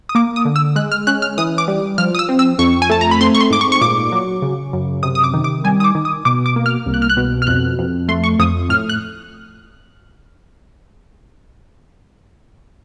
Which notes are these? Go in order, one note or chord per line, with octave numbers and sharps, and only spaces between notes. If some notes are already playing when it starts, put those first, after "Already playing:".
D#6
A#3 D6
D#6
D3
E6
G#3 F#6
F6
C#4 F#6
F6
E3 D#6
D6
G3
F3 F6
D#6
E6
C4
E6
F2 C#6
G#5
A3 A5
A#5
B5
C4 C6
C#6
C6
G#2 D6
C#6
C#6
A#2 D6
F#3
C#3
F#2
C3 D#6
D#6
D6
D#3
D6
G3 G#5
D#6
D6
D#3
D#6
B2 D6
D6
A#3
F6
C2
F#6
F6
F#6
B2
F6
F2 F#6
F2
A3 C6
C#6
F2 D#6
A2 F6
F#6